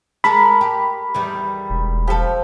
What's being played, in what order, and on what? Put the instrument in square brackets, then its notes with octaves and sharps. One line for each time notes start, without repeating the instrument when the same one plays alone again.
[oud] G#3 A4 [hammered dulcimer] A#4 C6 [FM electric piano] B5
[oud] G4
E2 D#3 G3
[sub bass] E1
[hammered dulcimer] F3 [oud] G4 A4